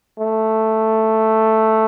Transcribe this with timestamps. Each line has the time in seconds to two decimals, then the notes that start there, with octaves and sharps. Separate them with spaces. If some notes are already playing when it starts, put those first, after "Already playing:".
0.19 A3